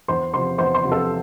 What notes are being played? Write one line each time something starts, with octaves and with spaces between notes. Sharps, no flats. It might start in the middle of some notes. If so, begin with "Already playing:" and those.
E2 C5 C6
C3 F3 C5 C6
E2 C5 C6
C5 C6
C3 F3
A4 A5